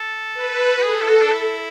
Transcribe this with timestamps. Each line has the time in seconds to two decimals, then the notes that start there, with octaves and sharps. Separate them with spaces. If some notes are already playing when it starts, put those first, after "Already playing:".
Already playing: A4
0.34 B4
0.77 F#4
0.82 G#4 A4
1.02 E4
1.07 F#4
1.21 D4
1.32 E4